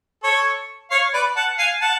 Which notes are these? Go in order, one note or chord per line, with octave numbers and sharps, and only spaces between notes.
A4 C#5
C#5 F5
B4 D5
F#5 A5
F5 G#5
F#5 A5